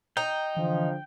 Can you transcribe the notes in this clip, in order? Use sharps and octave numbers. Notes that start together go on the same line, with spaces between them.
D#4 G5
D3 E3 F3